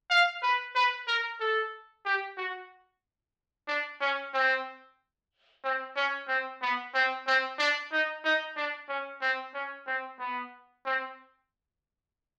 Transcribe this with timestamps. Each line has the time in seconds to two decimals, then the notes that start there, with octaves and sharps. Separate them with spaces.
0.10 F5
0.43 B4
0.75 B4
1.07 A#4
1.40 A4
2.05 G4
2.37 F#4
3.68 D4
4.01 C#4
4.34 C4
5.64 C4
5.96 C#4
6.28 C4
6.62 B3
6.94 C4
7.27 C4
7.59 D4
7.92 D#4
8.24 D#4
8.56 D4
8.89 C#4
9.21 C4
9.54 C#4
9.87 C4
10.19 B3
10.85 C4